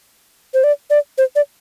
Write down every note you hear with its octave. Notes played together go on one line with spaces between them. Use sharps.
C5
D5
D5
C5
D5